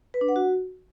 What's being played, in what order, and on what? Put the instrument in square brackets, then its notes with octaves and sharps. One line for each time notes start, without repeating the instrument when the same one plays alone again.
[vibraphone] B4
D4
F#5
F#4